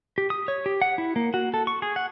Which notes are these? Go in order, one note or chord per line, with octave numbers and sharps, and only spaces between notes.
G4
D#6
C#5
G4
F#5
E4
A#3
F#4
A4
C#6
G#4
F#5